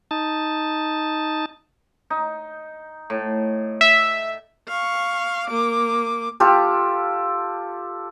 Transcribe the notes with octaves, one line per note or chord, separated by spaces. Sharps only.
D#4 A5
D#4
A2
E5
F5 C#6
A#3 D6
F4 G4 A4